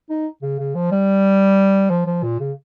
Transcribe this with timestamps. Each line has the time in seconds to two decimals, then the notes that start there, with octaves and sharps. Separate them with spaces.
0.10 D#4
0.43 C#3
0.59 C#3
0.75 F3
0.92 G3
1.90 F3
2.06 F3
2.23 A#2
2.40 C#3